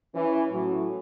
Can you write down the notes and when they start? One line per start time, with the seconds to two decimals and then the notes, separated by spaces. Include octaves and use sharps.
0.14 E3 C#4
0.50 A2 F#3